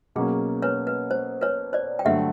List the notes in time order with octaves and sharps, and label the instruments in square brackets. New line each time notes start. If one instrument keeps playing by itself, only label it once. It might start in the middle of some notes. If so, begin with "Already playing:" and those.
[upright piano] B2 F#3 A#3 C#4 [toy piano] G#4
[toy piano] B4 C#5
B4
C5
B4 C#5
C5 D5
G5
[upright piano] G2 D3 F#3 A3 [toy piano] E5 F#5